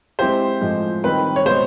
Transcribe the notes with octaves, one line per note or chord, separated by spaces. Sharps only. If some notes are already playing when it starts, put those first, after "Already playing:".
G#3 C4 E4 G4 C5
A2 F3 G#3
D#3 G3 C4 D#4 B4
C#5
B2 G#3 B3 C5